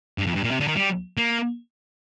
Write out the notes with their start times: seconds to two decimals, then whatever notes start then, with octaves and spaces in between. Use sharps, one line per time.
0.18 G2
0.27 F2
0.35 G2
0.44 A#2
0.51 C3
0.60 D3
0.68 D#3
0.76 G3
1.17 A#3